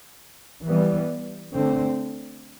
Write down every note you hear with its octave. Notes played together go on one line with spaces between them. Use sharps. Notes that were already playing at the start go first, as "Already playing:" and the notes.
E3 G3 B3
D3 A3 C4